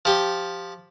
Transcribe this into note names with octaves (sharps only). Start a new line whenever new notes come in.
F3 G4